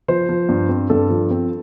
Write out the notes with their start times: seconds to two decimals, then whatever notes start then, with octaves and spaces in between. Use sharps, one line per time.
0.08 F3 C5
0.29 F3
0.49 G2
0.69 C4
0.90 G2 A4
1.10 F3
1.31 C4